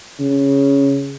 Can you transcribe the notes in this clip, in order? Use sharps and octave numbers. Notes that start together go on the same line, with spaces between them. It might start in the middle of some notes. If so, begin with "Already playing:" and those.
C#3